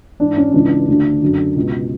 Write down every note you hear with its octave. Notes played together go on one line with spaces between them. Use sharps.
G#2 E3 D4
C#4
C#2 C#3 E3 D4
D2 D3
F#2 D3
C#2 B2